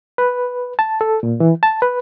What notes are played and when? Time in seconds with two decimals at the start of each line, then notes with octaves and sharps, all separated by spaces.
0.18 B4
0.79 A5
1.01 A4
1.23 A#2
1.40 E3
1.63 A5
1.82 B4